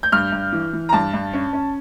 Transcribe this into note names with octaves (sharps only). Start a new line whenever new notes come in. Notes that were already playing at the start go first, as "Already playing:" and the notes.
G6
G2 F6
G2
E3
E3
A#5
G2 A5
G2
C#4
C#4